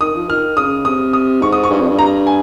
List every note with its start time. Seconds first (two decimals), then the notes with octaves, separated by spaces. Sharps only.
0.01 D#3 D#6
0.15 F3
0.29 D#3 F6
0.57 C#3 D#6
0.85 C3 D#6
1.13 D#6
1.41 G#2 C#6
1.52 D#6
1.63 C#6
1.70 G2
1.80 F2
1.88 G2
1.99 A#5
2.27 G#5